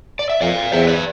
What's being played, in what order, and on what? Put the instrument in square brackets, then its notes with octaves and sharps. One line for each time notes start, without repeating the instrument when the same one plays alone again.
[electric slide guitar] D5
E5
[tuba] F2 [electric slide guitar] D5 F5
[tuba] E2 [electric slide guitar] C5 E5
[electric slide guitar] B4 D5